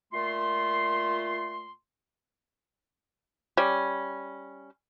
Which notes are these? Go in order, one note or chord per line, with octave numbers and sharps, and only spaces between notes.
A#2 A3 F4 C6
G3 C#4